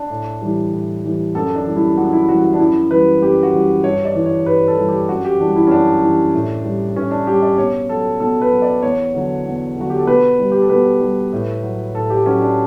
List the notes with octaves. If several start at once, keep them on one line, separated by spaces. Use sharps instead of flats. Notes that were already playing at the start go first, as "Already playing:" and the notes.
Already playing: D4
A2
E3 G3
A2
E3 G3
F#2 A4
D4
E3 G3
E4
F#2 F#4
E4
E3 G3 F#4
F#4
D4
F#2 E4
E3 G3 B4
F#2 G4
F#4
E3 G3
G2 C#5
D5
E3 G3
C#5
G2 B4
A4
E3 G3
G4
F#2 F#4
G4
E3 G3 D4
E4
C#4
F#2 D4
E3 G3
A2
G3
A2 C#4
D4
G3 G4
D5
B2 C#5
F#3 A4
B2 A4
B4
F#3
D5
E2 C#5
D3 F#3
E2
D3 F#3 F#4
G4
A4
B2 B4
G3
G4
A4
B2 B4
G3
A2
F#3
A2 A4
G4
F#3 C#4
D4